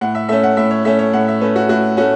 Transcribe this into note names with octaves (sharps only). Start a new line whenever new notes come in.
A2 F#5
E5
A3 C#4 E5
F#5
A2 E5
C#5
A3 C#4 E5
C#5
A2 F#5
E5
A3 C#4 B4
F#4
A2 F#4
A3 C#4 F#4